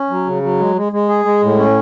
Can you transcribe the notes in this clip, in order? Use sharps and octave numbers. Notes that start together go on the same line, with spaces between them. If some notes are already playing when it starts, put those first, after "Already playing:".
Already playing: C#4
F#3
C#3
F#3
G#3
G#3
G#3
G#4
G#3
A2
C#4